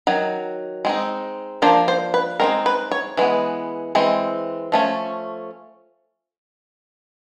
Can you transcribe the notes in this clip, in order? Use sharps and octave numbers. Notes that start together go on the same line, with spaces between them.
D#3 F#3
G#3 C4 D#4
F3 A#3 D4 C5
C5
B4
G#3 C4 D#4 A#4
B4
C#5
E3 G#3 B3
E3 G#3 C4
F3 A3 C#4